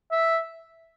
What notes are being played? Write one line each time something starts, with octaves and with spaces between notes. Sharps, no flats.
E5